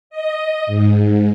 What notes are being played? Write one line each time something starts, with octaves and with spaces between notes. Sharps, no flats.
D#5
G#2